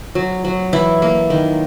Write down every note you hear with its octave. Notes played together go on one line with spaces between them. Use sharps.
F#3
F#3
E3 E4
A#3
D#3